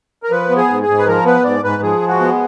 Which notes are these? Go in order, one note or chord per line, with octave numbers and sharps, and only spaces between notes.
A#4
F3 B4
B3
G#4
G#2
G#4
G#2
B4
F3 A#4
B3 B4
G#2 D5
G#2 B4
F3 G#4
G#3
F#4
B3